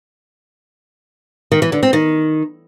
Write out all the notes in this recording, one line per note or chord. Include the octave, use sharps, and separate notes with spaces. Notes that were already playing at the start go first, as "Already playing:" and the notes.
D#3
E3
D3
C4
D#3